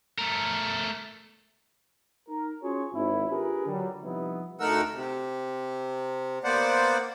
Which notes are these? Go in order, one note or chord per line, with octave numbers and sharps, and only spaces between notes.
A3 A#4
D#4 A#4
C#4 F4 F#4 G#4 C5 C#5
G#1 E4
D4 F4 G4 G#4 A#4 B4
D3 F#3 G3
C3 F3 G3 B3 D#4 E4
D2 A3 D#4 A#4 F#5 E6
C3
A#3 B3 C5 D5 F#5